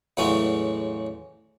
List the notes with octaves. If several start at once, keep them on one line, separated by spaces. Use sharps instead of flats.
E2 A2 C#3 F#3 G#3 C#4